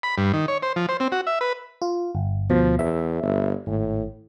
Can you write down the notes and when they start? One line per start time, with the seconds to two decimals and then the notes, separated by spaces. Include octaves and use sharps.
0.03 B5
0.18 G2
0.34 D#3
0.48 C#5
0.63 C5
0.76 F3
0.89 C5
1.00 C4
1.12 F#4
1.27 E5
1.41 B4
1.82 F4
2.15 G1
2.50 D2 B2 F3
2.79 E2 E5
3.23 G1
3.67 G#1 A2